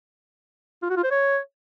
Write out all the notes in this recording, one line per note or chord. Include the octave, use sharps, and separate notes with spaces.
F4
F#4
F4
C5
C#5